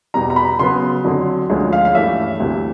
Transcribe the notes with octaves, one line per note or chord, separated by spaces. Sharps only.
E2 B2 G3 A#5
A#5
B5
C#3 F#3 B3 C6
F2 D3 F#3
D2 D3 F3 G#3 C#4
F5
F5
G2 E3 A3 C#4 E5
D2 C3 E3